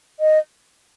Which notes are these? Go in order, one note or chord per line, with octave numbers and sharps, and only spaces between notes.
D#5